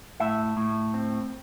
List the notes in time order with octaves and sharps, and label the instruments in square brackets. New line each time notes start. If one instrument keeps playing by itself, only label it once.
[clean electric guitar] A2 E5
A2
C4